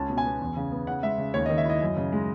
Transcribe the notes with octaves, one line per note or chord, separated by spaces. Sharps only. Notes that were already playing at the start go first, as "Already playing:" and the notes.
Already playing: C#2 C#4 A5
B2
G#5
B3
E2
C#3
B3
C#3 F#5
G#3 E5
C#3
D#2 C#5
D#3 D#5
E5
E4 D#5
F#2
C#3
G#3